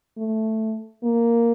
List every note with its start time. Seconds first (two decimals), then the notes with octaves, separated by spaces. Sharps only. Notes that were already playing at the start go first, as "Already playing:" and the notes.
0.18 A3
1.03 A#3